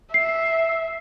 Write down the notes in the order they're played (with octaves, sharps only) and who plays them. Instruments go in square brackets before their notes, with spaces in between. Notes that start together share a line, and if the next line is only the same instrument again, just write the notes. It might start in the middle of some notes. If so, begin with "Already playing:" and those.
[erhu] E5 [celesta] C7